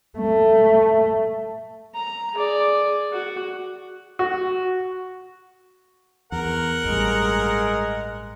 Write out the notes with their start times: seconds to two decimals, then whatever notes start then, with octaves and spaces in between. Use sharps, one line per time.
0.18 A3
1.94 A#5
2.34 G#4 D5
3.13 F#4
4.19 F#4
6.32 E2 A#4 F#5
6.84 A1 G2 G#3